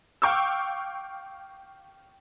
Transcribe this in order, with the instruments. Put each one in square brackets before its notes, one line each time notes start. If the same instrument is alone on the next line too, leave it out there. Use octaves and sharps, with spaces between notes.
[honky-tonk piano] F5 G5 C#6 D6 E6